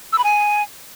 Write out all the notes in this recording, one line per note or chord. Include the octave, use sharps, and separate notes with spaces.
E6
B5
G#5